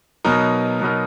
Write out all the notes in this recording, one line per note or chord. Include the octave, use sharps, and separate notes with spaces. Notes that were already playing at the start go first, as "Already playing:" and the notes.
B2 F#3 B3 D#4 A#4
B2 F#3 B3 D#4 A#4